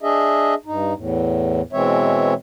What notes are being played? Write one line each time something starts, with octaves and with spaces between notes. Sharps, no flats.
D4 G#4 D#5 E5
G2 D#4
E2 A2
B2 E3 G#3 C4 C#5 E5